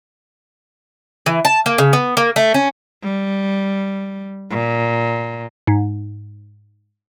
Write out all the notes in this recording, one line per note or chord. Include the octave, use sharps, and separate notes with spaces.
E3
A5
A#3
C#3
B3
A#3
A3
C#4
G3
A#2
G#2